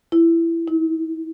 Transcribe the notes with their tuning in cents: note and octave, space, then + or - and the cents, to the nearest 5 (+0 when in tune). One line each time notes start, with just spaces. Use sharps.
E4 +15
E4 -40